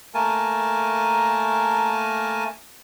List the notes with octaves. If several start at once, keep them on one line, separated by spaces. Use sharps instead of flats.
A3 A#3 A#4 G#5 A5